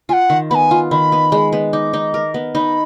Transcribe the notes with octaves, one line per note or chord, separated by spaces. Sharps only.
F4 F#5 G#5
D#3
B3 G#5 B5
F4
D#3 B5
B3
G#3
B3
D#4 D6
D#4
A#4
B3
D#4 B5